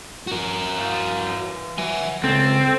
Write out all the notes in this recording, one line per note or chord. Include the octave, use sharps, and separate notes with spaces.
F#4 A#4
E3 F5
F#3 E5 G#5
C#2 C4 A4